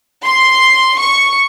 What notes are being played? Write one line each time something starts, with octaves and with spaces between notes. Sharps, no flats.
C6
C#6